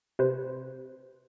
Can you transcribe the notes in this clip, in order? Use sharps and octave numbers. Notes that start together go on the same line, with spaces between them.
C3 B4 C5